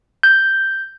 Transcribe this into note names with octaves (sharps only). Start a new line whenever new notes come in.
G6